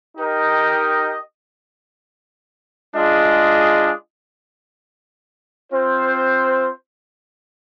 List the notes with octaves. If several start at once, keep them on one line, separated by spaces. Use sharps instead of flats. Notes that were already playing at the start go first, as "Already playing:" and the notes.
D#4 G4 A#4 D#5 G5
G#3 D4 F4 G#4 D#5
C4 F4 C5